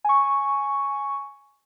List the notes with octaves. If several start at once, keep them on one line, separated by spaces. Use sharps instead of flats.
G#5 C#6